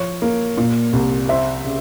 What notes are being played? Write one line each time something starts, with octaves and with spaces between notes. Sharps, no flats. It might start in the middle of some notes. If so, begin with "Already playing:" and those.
Already playing: F3 C#5
A#3
A#2
C2
C4 E5
C#3